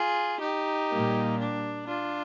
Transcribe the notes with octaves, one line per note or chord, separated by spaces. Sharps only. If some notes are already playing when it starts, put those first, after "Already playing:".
Already playing: F4 G#4
D#4 G4
A#2 G3 A#3
D4
D4 F4